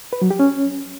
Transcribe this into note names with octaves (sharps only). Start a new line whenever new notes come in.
B4
F#3
G4
C#4